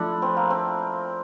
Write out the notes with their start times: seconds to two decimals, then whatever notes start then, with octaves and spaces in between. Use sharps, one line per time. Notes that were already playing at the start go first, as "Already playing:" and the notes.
Already playing: F3 A3 D4 E4
0.22 C4
0.36 A#3
0.50 C4